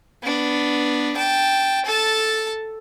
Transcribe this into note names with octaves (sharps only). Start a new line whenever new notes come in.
B3 D4
G5 A5
A4 A5